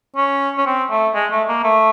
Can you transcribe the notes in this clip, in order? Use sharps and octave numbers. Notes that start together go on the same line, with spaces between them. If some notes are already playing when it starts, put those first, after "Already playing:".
C#4
C#4
C4
A3
G#3
A3
A#3
A3